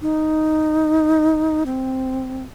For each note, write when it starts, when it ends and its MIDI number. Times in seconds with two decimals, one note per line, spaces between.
0.02 1.63 63
1.66 2.43 60